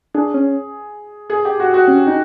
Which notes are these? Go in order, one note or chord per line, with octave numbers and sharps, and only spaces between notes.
D4 G#4
C#4
G#4
G4
F#4
F#4
C#4
D#4